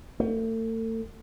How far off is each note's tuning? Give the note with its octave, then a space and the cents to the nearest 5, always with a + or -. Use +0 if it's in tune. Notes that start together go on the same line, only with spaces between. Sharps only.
A3 +40